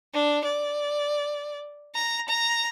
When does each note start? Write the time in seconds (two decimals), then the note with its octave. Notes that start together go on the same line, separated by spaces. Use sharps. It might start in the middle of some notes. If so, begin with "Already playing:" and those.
0.14 D4
0.45 D5
1.95 A#5
2.29 A#5